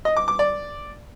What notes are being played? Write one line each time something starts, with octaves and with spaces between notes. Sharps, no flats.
D#5
D6
D6
D5